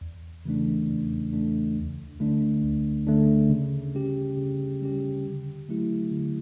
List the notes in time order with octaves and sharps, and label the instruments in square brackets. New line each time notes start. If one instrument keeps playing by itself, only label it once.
[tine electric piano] E2
C#3 E3 A3 D4
E2
C#3 E3 A3 D4
D2
D3 A3 D4
D2
D3 A3 D4
C#3
G3 C#4 G4
C#3
G3 C#4 G4
D3
F#3 A3 E4 G4
D3